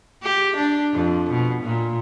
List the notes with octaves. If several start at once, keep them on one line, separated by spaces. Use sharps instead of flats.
G4
D4
F2
B2
A#2